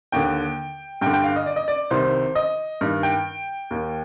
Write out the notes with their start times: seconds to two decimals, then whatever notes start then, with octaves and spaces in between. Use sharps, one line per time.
0.12 D#2 D3 G5
1.01 G2 G5
1.06 D3
1.14 G5
1.24 F5
1.36 D#5
1.46 D5
1.56 D#5
1.68 D5
1.91 C2 C3 D#3 C5
2.35 D#5
2.81 G2 D#3
3.03 G5
3.71 D#2 D#3